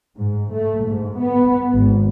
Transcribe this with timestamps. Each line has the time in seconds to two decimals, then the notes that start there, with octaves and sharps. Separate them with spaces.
0.16 G#2
0.51 A3
0.85 G#2
1.18 B3
1.71 G#1